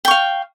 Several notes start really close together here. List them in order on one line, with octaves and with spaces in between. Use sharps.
G5 C#6 F5